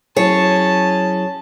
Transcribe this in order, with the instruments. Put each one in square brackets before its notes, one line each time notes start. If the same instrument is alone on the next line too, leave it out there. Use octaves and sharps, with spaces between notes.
[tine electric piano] F#3 E4 [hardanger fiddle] C#4 A5 [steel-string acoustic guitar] G#4 C#5